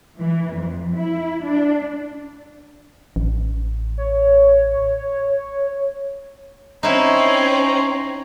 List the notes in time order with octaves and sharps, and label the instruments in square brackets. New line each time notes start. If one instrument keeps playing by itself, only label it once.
[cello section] E3
F2
E4
D4
[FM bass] A1
[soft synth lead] C#5
[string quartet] C4 C#4 [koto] D#4 E4 [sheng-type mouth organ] C#5 A#5 C6